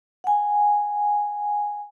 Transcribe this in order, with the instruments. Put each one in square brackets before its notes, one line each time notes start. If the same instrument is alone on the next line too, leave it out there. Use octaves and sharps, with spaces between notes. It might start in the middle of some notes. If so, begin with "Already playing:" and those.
[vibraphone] F#5 G#5